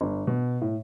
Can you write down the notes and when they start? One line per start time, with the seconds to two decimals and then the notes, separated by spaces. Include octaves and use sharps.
0.01 G1
0.27 B2
0.61 A2